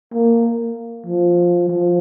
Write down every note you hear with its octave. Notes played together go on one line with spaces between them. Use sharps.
A#3
F3
F3